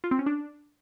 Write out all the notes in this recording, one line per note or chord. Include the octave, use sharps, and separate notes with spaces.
F4
C4
C#4
D4